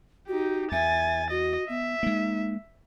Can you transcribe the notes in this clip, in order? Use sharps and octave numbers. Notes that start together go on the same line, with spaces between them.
D#4 F#4 G4
E2 E5 G#5 A6
F#4 D#5
B3 E5
G#3 A#3 D#4